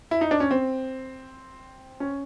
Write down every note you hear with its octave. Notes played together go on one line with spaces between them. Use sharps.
E4
D#4
D4
C#4
C4
C#4